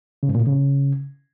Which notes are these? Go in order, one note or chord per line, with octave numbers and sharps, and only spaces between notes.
C#3
G#2
A#2
A2
C#3